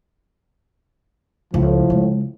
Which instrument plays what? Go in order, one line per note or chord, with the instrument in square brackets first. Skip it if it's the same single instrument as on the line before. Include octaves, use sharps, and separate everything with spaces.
[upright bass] C#2 [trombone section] A2 F3
[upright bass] C#3 G#3